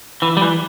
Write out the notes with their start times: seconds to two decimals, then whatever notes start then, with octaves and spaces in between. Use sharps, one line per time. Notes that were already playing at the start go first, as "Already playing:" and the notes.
0.22 E3
0.37 G3
0.41 E3